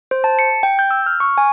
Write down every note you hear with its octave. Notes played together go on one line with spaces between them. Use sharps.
C5
A5
C#7
G5
G6
E6
F6
C#6
G#5